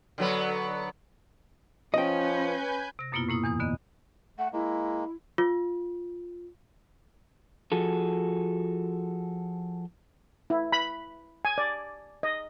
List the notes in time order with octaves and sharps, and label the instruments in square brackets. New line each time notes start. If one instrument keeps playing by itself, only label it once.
[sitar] D3 F#3 B3
[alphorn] F3 [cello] C#4 [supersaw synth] B4 G#5 G6 [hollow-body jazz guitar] D#5 G5
[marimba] C3 A#6
F#2 B2 A#3 B3 E4 F4
A2 A#3 E4 D#6
E2 E3 D#6
D3 B3 D#5
[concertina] A3 [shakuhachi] F#5
[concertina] G#3 A#3 [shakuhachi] E4
[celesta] F4
[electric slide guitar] F3 F#4 G#4 A4
[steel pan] E4
B5
G#5
D5
D#5